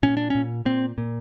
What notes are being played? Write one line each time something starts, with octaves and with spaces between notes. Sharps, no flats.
A#2 C#4
D4
A#2 C#4
A#2 C4
A#2